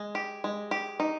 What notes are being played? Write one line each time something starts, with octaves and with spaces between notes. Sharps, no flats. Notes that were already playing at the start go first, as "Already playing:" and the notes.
Already playing: G#3
G4
G#3
G4
D#4